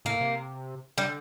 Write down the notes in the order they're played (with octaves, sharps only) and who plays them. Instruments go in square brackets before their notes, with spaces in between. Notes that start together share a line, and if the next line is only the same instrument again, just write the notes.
[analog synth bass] A2 [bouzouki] A#3
[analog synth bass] C3
[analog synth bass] D3 [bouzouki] G3